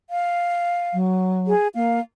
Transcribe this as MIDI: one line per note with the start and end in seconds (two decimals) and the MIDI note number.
0.10 0.96 77
0.93 1.53 54
1.47 1.68 68
1.75 2.00 58
1.75 2.00 77